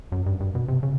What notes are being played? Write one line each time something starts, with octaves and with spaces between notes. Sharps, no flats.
F#2
G2
G2
B2
C3
C#3